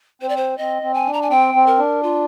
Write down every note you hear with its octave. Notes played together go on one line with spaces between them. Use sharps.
C4 C5
D5
C5
C4 D#5
C4
G#5
D4
A#5
G#5
C4 G5
C4
A#4
D4
F4